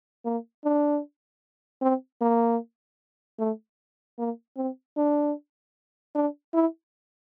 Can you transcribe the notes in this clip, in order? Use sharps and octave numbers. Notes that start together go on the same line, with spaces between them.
A#3
D4
C4
A#3
A3
A#3
C4
D4
D4
E4